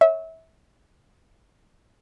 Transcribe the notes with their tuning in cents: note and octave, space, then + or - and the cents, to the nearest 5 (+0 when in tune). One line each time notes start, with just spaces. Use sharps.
C#5 +0 E5 -25